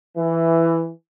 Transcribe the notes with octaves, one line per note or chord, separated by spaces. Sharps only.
E3